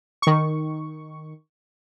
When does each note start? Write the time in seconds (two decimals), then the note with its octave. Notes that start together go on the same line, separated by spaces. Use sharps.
0.22 D#3 C#6